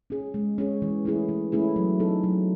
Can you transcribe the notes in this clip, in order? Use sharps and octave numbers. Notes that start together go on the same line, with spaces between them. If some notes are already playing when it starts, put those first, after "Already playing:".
C#4 G#4
G#3
C#4 G#4
E3
A3 C#4 E4 G#4
E3
A3 C#4 E4 G#4
F#3
C4 D#4 A4
F#3